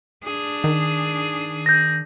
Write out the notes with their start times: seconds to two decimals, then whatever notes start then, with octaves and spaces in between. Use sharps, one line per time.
0.24 D4 G#4
0.64 D#3
1.66 G6 A#6